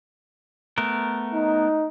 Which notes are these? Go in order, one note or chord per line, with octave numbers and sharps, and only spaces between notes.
A3 B3 A#4
D#4